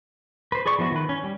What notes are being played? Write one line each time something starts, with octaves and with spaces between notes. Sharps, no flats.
B4 C5
G#4 B4 D5 C#6
F3 B3 E4 F#4
D#3 B4
C#4
G3